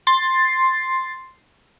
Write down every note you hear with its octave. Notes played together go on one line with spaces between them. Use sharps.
C6 A6 C7